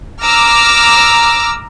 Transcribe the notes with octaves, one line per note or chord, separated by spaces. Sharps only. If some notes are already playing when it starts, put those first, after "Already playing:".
A#5 D6 E6 F6